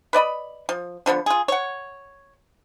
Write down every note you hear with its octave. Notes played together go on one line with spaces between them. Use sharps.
B4 D5 D#5 B5
F3
D3 F3 A#3 B3
F4 G#4
C#5 F#5